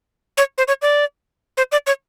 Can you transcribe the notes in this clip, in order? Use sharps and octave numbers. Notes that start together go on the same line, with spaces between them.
C#5
C5
C#5
D5
C5
D5
C#5